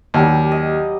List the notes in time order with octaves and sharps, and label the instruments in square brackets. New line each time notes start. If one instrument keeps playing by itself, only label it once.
[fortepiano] D#2 [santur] F#3 G3
[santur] D#5